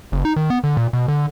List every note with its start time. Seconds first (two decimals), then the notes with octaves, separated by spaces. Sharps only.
0.12 F#1
0.25 D#4
0.36 D#3
0.50 B3
0.64 D3
0.77 A#2
0.93 B2
1.08 D3